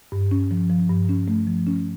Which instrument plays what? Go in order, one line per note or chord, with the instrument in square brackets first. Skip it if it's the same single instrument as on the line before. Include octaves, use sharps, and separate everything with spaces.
[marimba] G2
C#4
F3
F3
G2
C#4
A3
F3
C#4